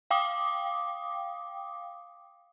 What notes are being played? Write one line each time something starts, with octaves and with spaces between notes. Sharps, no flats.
F5 G5 D6 D#6